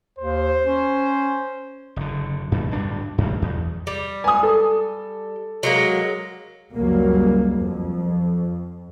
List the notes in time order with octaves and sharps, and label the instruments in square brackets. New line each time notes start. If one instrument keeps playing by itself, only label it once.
[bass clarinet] D#2 [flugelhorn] C5
[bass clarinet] C#4
[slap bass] F#1 D3
F#2 B2 D#3
D1 G2 D4
A1 F#2
E2
[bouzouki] G3
[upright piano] G#5 D#6
A4
[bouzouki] F#3 G#3 A#3
[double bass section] F#1 C#2 F#3 G3 A#3
F2